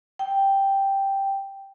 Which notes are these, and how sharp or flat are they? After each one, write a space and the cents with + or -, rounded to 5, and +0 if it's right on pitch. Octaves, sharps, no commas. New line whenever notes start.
G5 +0